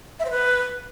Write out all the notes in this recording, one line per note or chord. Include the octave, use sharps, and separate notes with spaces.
E5
C5
B4